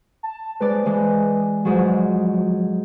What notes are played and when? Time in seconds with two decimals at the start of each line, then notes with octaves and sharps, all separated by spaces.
0.23 A5
0.60 G#3 B4 D5
0.86 E3 G#3
1.65 G#2 F3 F#3
2.37 F3